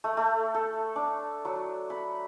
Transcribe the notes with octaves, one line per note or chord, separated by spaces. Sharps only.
A3
A3
A4
D4
F#3
B5